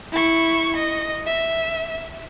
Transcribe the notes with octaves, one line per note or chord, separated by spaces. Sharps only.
E4 C#6
D#5
E5